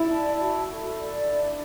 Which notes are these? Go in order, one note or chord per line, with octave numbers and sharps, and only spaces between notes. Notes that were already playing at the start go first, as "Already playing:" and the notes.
Already playing: E4 D5
A5
F#4
A4
D5
D4